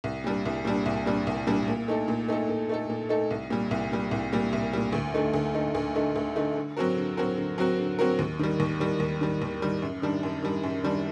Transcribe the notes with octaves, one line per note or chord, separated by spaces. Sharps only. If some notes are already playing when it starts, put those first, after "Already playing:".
C2
A#2 G3 D4
C2
A#2 G3 D4
C2
A#2 G3 D4
C2
A#2 G3 D4
A#2
A3 D#4 A4
A#2
A3 D#4 A4
A#2
A3 D#4 A4
A#2
A3 D#4 A4
C2
A#2 G3
C2
A#2 G3
C2
A#2 G3
C2
A#2 G3
D2
D3 A3 D#4
D2
D3 A3 D#4
D2
D3 A3 D#4
D2
D3 A3 D#4
D3
F#3 C4 F#4 A#4
D3
F#3 C4 F#4 A#4
D3
F#3 C4 F#4 A#4
D3
F#3 C4 F#4 A#4
D#2
D#3 G3
D#2
D#3 G3
D#2
D#3 G3
D#2
D#3 G3
F#2
D#3 G3 D4
F#2
D#3 G3 D4
F#2
D#3 G3 D4